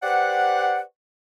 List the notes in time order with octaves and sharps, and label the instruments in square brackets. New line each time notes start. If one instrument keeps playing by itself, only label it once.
[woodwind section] G4 B4 C5 D5 F#5